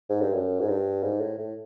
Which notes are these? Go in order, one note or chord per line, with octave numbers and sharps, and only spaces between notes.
G#2
G2
F#2
G#2
G2
G#2
A2
A2